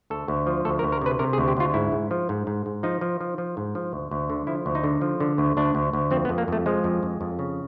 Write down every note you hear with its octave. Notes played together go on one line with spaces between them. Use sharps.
D2 A4
D2
F3
D2 A4
A#4
D2
A#4
C3 B4
C3 A#4
G#4
D2
G4
D2 F4
G#2 E4
G#2
F3
G#2
G#2
G#2
F3 D#4
F3
F3
F3
G#2
F3
D2
D2
D3
F3 E4
D2
D#4
D3
F3
D3
D2
D2 D4
D2
D2
F2 C4
B3
F2
A#3
F2 A3
F3 G#3
F2
F2
F2
C#3